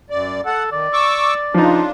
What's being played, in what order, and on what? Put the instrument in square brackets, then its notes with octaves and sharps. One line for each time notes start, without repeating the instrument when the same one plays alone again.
[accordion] F#2 D5
[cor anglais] A4 [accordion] F#5
[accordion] D#3 [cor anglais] D5
[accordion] C#6 D6 E6
[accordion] C#3 D4 F4 [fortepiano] F3 D#4